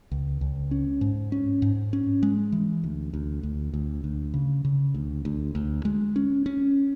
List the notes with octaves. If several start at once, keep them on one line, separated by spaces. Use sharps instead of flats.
C#2
C#2
C#4
G#2
C#4
G#2
C#4
G#3
E3
D2
D2
D2
D2
D2
C#3
C#3
D2
D2
D2
G#3
C#4
C#4